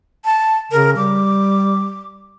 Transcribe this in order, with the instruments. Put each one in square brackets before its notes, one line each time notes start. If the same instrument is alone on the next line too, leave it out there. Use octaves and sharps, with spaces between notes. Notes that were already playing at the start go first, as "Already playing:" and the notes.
[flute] A5
[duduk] C#3 [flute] A#4
[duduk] G3 [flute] D6